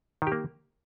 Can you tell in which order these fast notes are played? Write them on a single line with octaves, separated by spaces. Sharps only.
D#3 G4 A#3